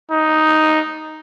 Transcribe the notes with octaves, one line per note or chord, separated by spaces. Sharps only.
D#4